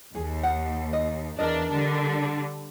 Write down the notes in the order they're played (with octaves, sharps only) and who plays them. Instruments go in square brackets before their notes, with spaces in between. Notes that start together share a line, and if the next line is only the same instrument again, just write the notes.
[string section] D#2 [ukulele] G#4
[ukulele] F#5
D#5
[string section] E2 D4 [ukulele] A#4 D#5
[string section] D3 G3 D4